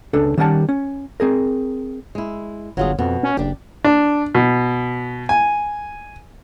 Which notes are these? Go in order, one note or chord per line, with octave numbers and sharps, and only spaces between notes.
C#2 D4 A4 B4
D#3 G3 C#4 A#4 F#5 A5
C#4
C4 G#4 A#4
G#3 E4
G1 F#3 F4 G#4
F2 B2
C#4
F#1 D4 G4
D4
B2
G#5